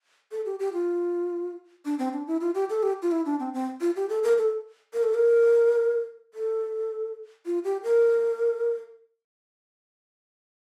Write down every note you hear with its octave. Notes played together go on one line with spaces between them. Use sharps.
A4
G4
G4
F4
D4
C4
D4
E4
F4
G4
A4
G4
F4
E4
D4
C4
C4
F4
G4
A4
A#4
A4
A#4
A4
A#4
A4
F4
G4
A#4